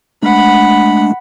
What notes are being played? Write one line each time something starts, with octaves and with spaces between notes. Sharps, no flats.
G#3 A3 D4 F#5 B5